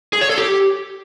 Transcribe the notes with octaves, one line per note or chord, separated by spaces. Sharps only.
G#4
C#5
A4
G4